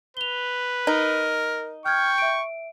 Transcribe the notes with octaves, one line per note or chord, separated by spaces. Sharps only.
B4 F7 G7
D#4 A#4
G5 C#6 F6 G#6
E5 D7